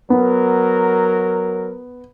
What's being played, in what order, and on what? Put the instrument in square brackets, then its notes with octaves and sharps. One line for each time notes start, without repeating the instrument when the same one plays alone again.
[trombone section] F#3 A#4 [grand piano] B3